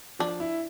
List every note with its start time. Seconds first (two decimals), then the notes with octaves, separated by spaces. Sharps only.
0.19 F3 D4
0.40 E4